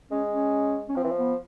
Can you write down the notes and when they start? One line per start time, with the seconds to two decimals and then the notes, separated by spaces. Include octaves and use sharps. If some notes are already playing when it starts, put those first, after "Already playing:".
0.11 G#3 C#4
0.32 C#4
0.89 C#4
0.96 F3 C4
1.04 E3
1.11 F3
1.17 B3